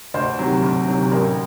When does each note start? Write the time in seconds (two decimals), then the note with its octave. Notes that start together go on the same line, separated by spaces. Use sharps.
0.14 D2 C5
0.39 C3 D#3 F#3
0.63 D2
0.87 C3 D#3 F#3
1.12 A1 A#4